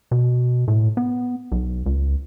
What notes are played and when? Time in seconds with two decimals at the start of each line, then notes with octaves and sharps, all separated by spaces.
0.11 B2
0.68 A2
0.97 B3
1.52 B1
1.86 C#2